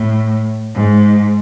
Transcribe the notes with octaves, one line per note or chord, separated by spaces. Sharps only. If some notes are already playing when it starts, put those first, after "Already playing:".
Already playing: A2
G#2